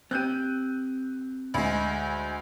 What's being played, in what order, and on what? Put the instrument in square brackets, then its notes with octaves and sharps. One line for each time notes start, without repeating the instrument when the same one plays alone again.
[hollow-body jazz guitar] C4 G4 [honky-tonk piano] F#6 G6 D#7
[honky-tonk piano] D2 G#3